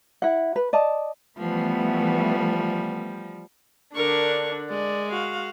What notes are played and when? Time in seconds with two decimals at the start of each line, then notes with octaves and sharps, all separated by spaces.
0.22 E4 F#5
0.56 B4
0.73 D5 D#5 A5
1.38 E3 F3 G3 A3 B3
3.95 D3 D4 A#4 C#6
4.70 G#3 D5
5.10 F#4 F5